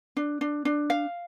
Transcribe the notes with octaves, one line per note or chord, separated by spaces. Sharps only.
D4
D4
D4
F5